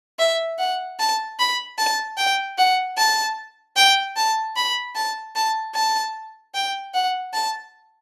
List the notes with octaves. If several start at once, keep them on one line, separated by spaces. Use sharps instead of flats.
E5
F#5
A5
B5
A5
G5
F#5
A5
G5
A5
B5
A5
A5
A5
G5
F#5
A5